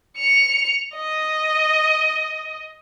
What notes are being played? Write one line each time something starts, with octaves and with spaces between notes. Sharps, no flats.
C#7 F7
D#5